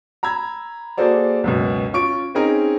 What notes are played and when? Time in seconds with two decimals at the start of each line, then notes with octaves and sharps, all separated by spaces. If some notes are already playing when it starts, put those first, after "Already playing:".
0.23 A#5 B5 E6 G#6
0.97 A#3 F#4 G#4 A4 C5 D5
1.44 C#2 F#2 B2
1.93 C#4 F4 C#6 D7
2.35 C4 C#4 D#4 G#4 A#4